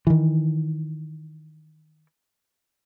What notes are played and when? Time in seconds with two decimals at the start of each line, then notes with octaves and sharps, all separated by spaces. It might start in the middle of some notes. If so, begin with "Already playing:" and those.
0.07 D#3 E3